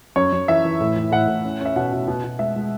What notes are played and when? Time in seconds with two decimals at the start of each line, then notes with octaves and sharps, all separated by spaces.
0.16 F#2 C#5
0.32 F#2
0.48 E3 E5
0.65 E3
0.81 A2
0.96 E3
1.12 A2 F#5
1.27 A2
1.45 C#4
1.61 C#4 E5
1.76 B2 F#5
1.92 B2
2.07 B2
2.24 B2
2.39 G#3 E5
2.56 G#3